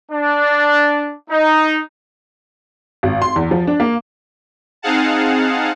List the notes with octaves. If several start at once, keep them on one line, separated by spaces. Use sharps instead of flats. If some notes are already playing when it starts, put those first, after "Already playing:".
D4
D#4
G#1
C6
E2
F3
D4
A#3
C4 D#4 G#4 F5 F#5 A5